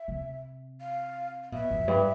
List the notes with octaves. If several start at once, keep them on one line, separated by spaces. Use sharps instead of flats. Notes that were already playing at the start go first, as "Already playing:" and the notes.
Already playing: E5
C3
F5
F5
B2 E5
F2
G2